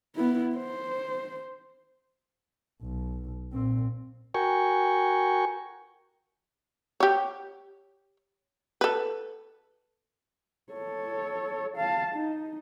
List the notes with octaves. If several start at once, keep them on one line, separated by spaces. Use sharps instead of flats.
B3 E4
C5
B1
A#2 C4
F#4 A#4 G5 G#5 C#6
G4 C#5
A4 B4
A4 C#5
F5 A5
D#4